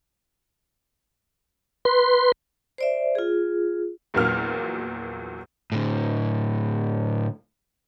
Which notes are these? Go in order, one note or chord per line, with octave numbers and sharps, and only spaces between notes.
B4 C6
C5 D5 E5
F4 G#4
A#1 E2 A#2 F#3 A#3 F6
A2 D3